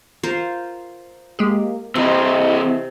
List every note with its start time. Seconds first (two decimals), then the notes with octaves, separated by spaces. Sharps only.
0.23 F4 A#4 C5
1.39 G#3 A#3 G4 G#4
1.96 C3 E3 C4 E4 D#5 E5